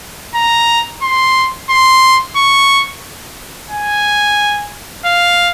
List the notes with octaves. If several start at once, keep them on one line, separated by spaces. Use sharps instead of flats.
A#5
C6
C6
C#6
G#5
F5